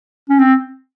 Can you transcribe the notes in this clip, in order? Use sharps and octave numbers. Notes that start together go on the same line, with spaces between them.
C#4
C4